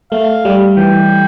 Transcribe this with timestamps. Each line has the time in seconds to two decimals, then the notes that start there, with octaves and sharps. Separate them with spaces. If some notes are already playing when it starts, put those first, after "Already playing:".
0.11 A3 F5
0.45 G3
0.77 E3 G5